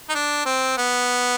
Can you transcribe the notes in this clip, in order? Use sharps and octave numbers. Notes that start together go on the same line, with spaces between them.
D#4
D4
C4
B3